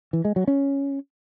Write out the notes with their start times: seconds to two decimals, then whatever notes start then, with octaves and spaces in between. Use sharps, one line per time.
0.13 E3
0.25 G#3
0.36 F#3
0.47 C#4